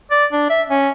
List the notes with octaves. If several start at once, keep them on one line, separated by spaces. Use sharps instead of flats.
D5
D4
E5
C#4